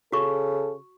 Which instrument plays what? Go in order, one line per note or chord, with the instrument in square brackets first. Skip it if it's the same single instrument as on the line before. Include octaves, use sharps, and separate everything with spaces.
[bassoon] C#3 [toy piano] F#4 C#6 [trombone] A4